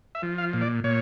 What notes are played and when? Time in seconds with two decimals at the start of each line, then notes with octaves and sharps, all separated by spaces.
0.15 E5
0.23 F3
0.38 F5
0.53 A#2
0.61 D5
0.84 A#2 C#5